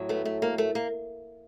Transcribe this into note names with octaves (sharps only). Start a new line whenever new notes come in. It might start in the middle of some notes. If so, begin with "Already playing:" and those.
Already playing: A2 F#3
A3 B3
A3
A#3
A3
A#3